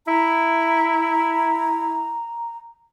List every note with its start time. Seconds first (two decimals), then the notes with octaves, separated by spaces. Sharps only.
0.07 E4 A#5